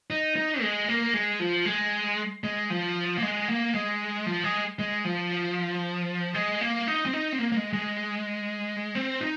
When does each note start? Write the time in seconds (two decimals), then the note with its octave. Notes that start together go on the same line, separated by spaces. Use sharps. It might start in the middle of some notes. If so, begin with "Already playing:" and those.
0.10 D#4
0.36 D#4
0.61 G#3
0.88 A#3
1.14 G#3
1.40 F3
1.65 G#3
2.44 G#3
2.70 F3
3.18 A#3
3.22 G#3
3.48 A#3
3.75 G#3
4.26 F3
4.44 G#3
4.79 G#3
5.05 F3
6.34 G#3
6.61 A#3
6.87 D#4
7.06 C4
7.13 D#4
7.33 C4
7.39 A#3
7.52 A#3
7.57 G#3
7.73 G#3
8.95 C4
9.21 D#4